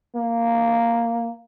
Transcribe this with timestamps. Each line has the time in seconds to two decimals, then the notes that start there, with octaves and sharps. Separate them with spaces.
0.16 A#3